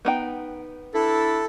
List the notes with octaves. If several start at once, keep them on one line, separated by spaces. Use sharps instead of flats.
B3 D#4 G5
A3 D4 E4 A4